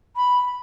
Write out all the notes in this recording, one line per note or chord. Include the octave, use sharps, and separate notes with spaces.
B5